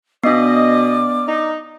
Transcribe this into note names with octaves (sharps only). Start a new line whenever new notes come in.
B2 B3 D4 D5 D#5 D6 F6
D#4